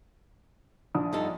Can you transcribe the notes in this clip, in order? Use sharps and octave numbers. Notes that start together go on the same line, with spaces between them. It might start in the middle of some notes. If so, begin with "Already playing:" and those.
A#1 D4 D#6
G2 D#4 A4